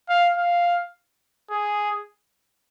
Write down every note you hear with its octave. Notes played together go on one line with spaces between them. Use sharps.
F5
F5
G#4